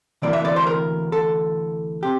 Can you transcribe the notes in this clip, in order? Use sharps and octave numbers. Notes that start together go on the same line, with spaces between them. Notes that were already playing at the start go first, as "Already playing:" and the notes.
D2 C3 E3 A#3 D5
E5
D5
C5
A#4
A4
C3 G4